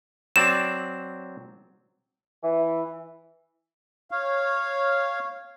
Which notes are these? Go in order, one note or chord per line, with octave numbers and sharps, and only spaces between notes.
F#3 C4 D5 E7
E3
C#5 F5